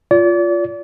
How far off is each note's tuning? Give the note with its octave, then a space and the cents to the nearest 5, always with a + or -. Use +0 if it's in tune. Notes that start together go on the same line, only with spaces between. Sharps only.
F4 +0 D5 -35